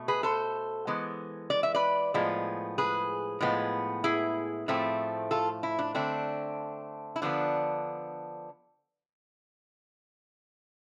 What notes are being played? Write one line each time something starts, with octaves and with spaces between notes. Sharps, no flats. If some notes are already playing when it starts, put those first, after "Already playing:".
Already playing: B2 A3
G#4 B4
A4 C5
E3 G#3 B3
D5
E5
B4 D5
A2 F3 G#3 B3
G#4 B4
A2 F3 G#3 B3
E4 G#4
A2 F3 A3 C4
F4 A4
E4
D4
D3 A3 C4 D4
E4
D3 F3 B3 D4